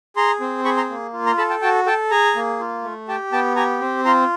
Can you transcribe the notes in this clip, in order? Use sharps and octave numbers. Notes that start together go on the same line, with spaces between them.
G#4 A#5 C6
C4
G#4 B5 C#6
A#5 C6
A#3
F4
A#5 C6
A4 A5 B5
G5 A5
F#4 G5 A5
A4 G5 A5
G#4 G#5 A#5
A#3
F4
A3
G4 G5 A5
B3 G5 A5
G4 G#5 A#5
C4
F4 A#5 C6